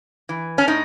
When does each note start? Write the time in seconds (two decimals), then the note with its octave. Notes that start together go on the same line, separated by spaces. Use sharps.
0.29 E3
0.58 C#4
0.68 A2 D#4